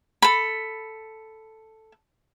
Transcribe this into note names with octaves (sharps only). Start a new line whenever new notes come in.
A4 B5